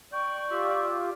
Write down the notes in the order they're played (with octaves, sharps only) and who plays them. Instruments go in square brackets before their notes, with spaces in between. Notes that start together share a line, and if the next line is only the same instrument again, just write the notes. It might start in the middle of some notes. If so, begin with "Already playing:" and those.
[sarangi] D5 [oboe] G5 [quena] C#6
[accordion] F4 G4 [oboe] E5